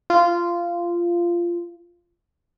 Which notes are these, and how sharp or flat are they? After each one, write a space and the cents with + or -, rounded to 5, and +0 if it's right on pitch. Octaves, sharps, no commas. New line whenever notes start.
F4 -15